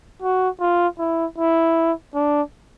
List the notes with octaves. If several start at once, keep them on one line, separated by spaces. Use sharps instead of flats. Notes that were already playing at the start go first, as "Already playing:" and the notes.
F#4
F4
E4
E4
D4